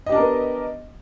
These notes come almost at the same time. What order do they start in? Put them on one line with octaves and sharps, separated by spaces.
D#5 G4 D4 A#4 B3